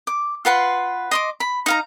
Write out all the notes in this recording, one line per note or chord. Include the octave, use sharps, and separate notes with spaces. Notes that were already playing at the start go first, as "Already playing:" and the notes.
D6
F4 B4 F#5 C6
D#5 C6 D6
B5
D#4 F5 A#5